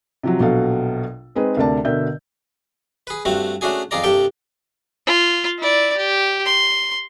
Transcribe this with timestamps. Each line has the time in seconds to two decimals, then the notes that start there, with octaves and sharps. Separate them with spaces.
0.23 C3 F3 F#3
0.40 A#1 B2 F#3 A4 F5
1.35 G#3 C4 D#4 G#4 B4
1.57 D2 C3 A#4 D5 A5
1.85 B2 D3 A#4 E5 G6
3.07 G#4 B4
3.25 G2 A3 C4 F#4
3.61 A3 C#4 D4 F#4 G#4 G#5
3.91 F2 F4 G#4 D5 A#5
4.04 C2 G2 G4 A4 G5
5.07 F4
5.59 E4 D5
5.97 G4
6.45 C6